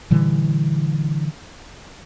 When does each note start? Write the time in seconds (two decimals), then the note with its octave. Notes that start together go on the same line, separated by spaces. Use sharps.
0.11 A#2 D3 E3 G3